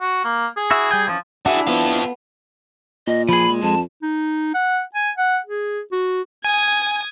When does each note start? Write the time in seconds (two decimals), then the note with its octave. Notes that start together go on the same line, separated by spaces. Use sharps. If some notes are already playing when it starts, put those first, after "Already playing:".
0.01 F#4
0.24 A#3
0.57 G#4
0.71 E4 F#4 E5
0.91 G3 G5 G#5
1.08 E3 F3 B3 C#4
1.46 D4 E4 F#4 G#4 E5
1.67 B3 F4 A4
3.07 A#2 D#5
3.29 F3 G#4 B5
3.50 G#3
3.63 F2 A5
4.02 D#4
4.54 F#5
4.95 G#5
5.18 F#5
5.46 G#4
5.92 F#4
6.45 G#5 D#6 G#6